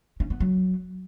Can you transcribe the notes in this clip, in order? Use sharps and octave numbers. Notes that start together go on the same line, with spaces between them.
C#4
B3
F#3